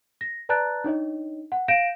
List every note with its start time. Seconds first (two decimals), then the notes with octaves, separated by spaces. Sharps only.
0.21 A#6
0.49 B4 D5 A5 A#5 F#6 A6
0.84 D4 D#4 C#5 D#5
1.52 F#5
1.68 F5 G6 A#6 D7 E7